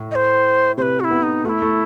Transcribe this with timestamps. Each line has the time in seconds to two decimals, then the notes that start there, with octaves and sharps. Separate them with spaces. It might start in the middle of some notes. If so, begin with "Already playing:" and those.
Already playing: A2
0.11 D#5
0.15 C5
0.78 C3 C5
0.82 B4
1.00 F#4
1.04 E4
1.11 B3
1.23 D#4
1.44 A3 F#4
1.49 E4
1.62 A3